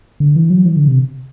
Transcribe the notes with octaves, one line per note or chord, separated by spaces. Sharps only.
D3
E3
F#3
E3
D3
C3